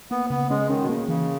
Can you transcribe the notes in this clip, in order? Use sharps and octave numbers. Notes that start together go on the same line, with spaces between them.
A#3 B3
C#3 B3
G#3 C#4
D#3 C#4
B2
C#3 A#3
C#3 E3